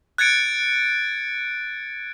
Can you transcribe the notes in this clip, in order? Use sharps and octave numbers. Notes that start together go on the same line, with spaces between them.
F#6 G#6 A6 C#7 D7